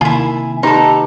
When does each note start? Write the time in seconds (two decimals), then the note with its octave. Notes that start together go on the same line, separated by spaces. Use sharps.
0.01 C3 D#3 A#3 E4 F4 G#5
0.63 D#4 G4 A4 B4 A#5